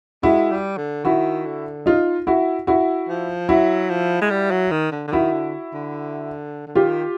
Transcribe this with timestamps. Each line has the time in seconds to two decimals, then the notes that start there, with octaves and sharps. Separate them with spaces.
0.23 G#3 E4 F#4
0.51 G3
0.77 D3
1.04 D#3 E4 F#4
1.46 D3
1.86 D#4 F4
2.27 E4 F#4
2.67 E4 F#4
3.09 F3
3.49 F#3 E4 F#4
3.90 F3
4.22 G#3
4.31 G3
4.51 F#3
4.71 D#3
4.92 D3
5.08 D3
5.12 D#3 E4 F#4
5.33 D3
5.73 D3
6.67 D3
6.75 D#3 F4 G4